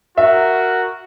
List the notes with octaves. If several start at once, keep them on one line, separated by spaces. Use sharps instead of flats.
F#4 A#4 E5